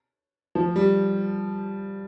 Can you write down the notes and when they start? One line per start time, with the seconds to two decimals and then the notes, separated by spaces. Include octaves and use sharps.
0.55 F3
0.76 G3